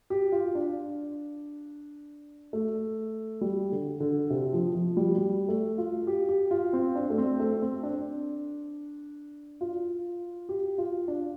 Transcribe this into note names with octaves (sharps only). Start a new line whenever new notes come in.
G4
F4
D4
A3
G3
D3
D3
C3
F3
F3
G3
G3
A3
F4
G4
G4
F4
C4
D4
A3
C4
A3
C4
D4
F4
G4
F4
D4